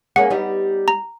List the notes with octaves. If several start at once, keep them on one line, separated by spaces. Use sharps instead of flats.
A#3 C#4 G#4 F#5
G3 B3 D#4
A#5